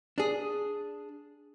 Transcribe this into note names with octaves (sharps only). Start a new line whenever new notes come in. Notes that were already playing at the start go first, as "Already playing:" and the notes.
D4 G#4